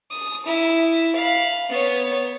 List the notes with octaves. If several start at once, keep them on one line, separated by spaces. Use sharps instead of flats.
D#6
E4
F5 B5
B3 C#5